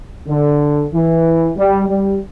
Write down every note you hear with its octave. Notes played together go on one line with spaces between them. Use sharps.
D3
E3
G3
G3